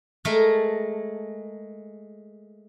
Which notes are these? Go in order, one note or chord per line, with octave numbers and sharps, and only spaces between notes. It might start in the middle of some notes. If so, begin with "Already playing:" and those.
G#3 A3 A#4 A5